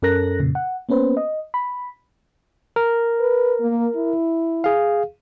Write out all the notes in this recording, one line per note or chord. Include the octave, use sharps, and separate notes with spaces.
F#2 C#4 A4 A#4 F#6 A#6
F2 A#2 C#3
F#5
A#3 B3 C#4 B4 C5
D#5
B5
A#4
B4
A#3
E4
G#4 F5